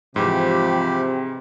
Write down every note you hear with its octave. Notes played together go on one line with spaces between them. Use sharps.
G#2 C3 E3 F3 G4 B5